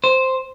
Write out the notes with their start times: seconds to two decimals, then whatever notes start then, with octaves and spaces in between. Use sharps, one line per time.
0.04 C5